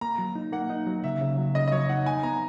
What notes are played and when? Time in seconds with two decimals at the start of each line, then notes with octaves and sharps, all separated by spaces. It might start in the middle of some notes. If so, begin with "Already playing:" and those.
0.01 A#3 A#5
0.19 F#3
0.35 D#4
0.52 A#3 F#5
0.70 D#4
0.87 F#3
1.04 C#3 E5
1.21 C#3
1.38 F#3
1.55 C#3 D#5
1.68 D#5
1.72 F#3 C#5
1.89 D#4 F#5
2.06 D#4 G#5
2.23 B3 A#5